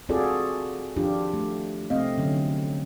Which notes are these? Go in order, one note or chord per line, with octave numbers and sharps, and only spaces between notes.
C4 F4 F#4 G#4 A4 D5
D#3 F3 D4 F4 G4
A3
A3 C4 D#5 F5
D3 F#3 C#4